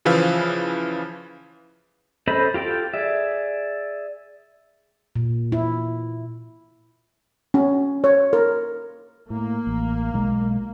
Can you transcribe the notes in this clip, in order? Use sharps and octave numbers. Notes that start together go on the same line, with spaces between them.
C#3 E3 F3 B4 F5 E6
C#4 A4 C5 D#5 B5
F4 G4 A4 G5
G#4 D5 E5
A#2
E4
C#4
C#5
A#4
A2 A#3
A1
B1 G#3